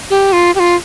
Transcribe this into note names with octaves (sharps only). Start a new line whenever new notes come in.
G4
F4
G4
F4